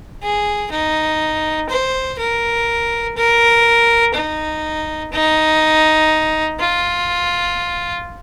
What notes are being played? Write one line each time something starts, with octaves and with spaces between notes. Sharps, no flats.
G#4
D#4
C5
A#4
A#4
D#4
D#4
F4